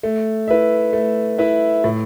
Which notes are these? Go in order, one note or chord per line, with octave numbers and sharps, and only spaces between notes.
A3
E4 B4 E5
A3
E4 B4 E5
A2